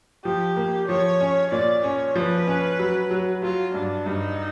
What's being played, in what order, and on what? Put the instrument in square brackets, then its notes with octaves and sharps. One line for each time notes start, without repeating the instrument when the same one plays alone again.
[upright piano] F3 [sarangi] G4
[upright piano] A#3
[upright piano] F3 [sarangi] C#5
[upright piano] C#4
[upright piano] A#2 [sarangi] D5
[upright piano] C#4 [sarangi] C#5
[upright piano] F3 [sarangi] B4
[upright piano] C#4
F#3
F#3
[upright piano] F#3 [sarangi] F4
[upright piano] G2 [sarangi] D4
[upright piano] G2 [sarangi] D#4